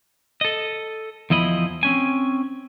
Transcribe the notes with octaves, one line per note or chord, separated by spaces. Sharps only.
A4 D#5
E2 F3 E4 D#5 B5
C4 C#4 G#5